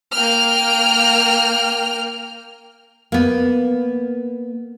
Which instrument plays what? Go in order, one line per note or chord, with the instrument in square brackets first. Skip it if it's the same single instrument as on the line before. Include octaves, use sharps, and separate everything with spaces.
[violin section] A#3 G5 F6
[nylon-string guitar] A#3 B3